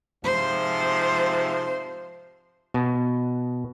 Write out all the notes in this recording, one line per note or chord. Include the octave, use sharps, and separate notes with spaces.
G#2 C3 F3 C5
B2